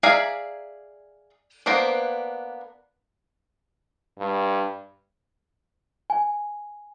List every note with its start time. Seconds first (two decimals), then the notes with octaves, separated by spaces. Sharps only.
0.03 G#4 D5 E5 F5 A#5
1.66 A#3 B3 D4 C5
4.19 G2
6.10 G#5